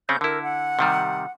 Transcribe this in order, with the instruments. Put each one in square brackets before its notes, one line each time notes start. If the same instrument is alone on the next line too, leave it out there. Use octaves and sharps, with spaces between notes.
[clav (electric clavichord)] C#3 C4 C#4 [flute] G6
[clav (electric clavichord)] D3 E4 [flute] A#4
[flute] F#5
[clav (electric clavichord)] C3 D#3 G3